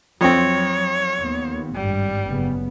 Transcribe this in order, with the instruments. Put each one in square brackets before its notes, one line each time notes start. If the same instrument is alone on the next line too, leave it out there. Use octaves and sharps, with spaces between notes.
[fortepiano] F2 C4 [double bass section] F#3 [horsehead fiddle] C#5
[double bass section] D#2 B3
[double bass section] G#1 G2 [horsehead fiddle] G3
[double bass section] F#1 C#3 B3